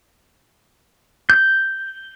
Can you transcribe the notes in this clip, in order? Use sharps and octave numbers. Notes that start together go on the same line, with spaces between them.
G6